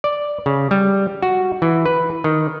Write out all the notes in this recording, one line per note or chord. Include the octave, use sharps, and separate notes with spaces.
D5
C#3
G3
F#4
E3
B4
D#3